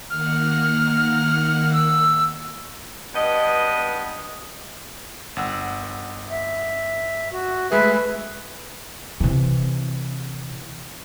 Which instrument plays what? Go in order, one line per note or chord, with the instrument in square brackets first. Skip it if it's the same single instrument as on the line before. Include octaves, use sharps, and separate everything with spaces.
[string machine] D#3 A#3 F#5 [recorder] F6
[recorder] E6
[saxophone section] G2 B3 D#5
[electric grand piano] G1 F#5 E6
[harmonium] E5
F#4
[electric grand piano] G#3 A3 G#4 [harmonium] B4 E5
[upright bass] C3 E3